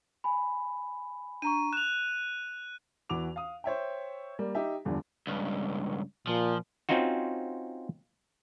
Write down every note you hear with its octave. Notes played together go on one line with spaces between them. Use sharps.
G#5 B5
D4 A#5 C#6 D#7
F#6 E7 F7
E2 E3 F#4 B4 D6 F7
F5 D#6
C5 C#5 E5 G5
G3 A#3
D#4 G4 E5
G1 E2 D3 F3 G3
C#2 G2
A#2 F3
C4 C#4 D#4 F4 F#4